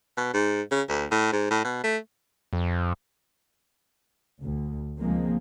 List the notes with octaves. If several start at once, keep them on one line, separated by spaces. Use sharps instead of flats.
B2
G#2
C#3
D2
A2
G#2
A2
B2
A3
F2
D2
C#2 D#3 F3 G#3 A#3 C4